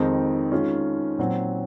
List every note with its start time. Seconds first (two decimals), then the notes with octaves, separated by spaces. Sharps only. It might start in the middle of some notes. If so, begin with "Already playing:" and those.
Already playing: F2 D#3 G#3 C4 D#4
0.52 D#3 G#3 C#4 F4
1.18 A#2 F#3 C4